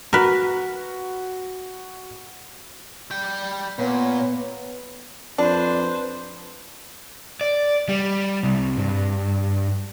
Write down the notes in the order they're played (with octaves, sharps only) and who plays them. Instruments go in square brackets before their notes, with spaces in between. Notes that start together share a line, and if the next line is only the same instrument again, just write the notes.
[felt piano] F#4 [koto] A#4 B4
[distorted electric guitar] G3 G5
[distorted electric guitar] A#2 [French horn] B3 [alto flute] C#5
[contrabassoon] F2 [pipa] D4 [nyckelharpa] B4 C5
[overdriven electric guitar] D5
G3
C2
G2